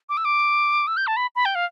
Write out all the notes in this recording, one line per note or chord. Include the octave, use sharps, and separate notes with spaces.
D6
E6
D6
E6
G6
A5
B5
B5
G5
F5